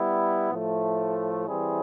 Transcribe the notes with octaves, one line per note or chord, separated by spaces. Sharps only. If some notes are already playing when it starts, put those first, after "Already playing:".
Already playing: G3 B3 E4
A2 F3 A3
E3 G3 C4 E4 G#4